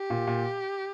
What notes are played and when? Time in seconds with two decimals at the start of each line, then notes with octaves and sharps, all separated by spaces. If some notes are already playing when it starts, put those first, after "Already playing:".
Already playing: G4
0.10 A#2
0.27 A#2